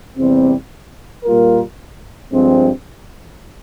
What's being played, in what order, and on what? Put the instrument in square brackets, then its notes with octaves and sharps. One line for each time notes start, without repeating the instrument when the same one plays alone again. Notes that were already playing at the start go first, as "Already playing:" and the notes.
[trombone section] E2 C3 G3 C4
A#2 G3 A#3 F4 A#4
G2 F3 G#3 C4